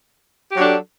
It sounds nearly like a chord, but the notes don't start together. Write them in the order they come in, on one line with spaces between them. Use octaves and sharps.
G4 F#3 D4 A4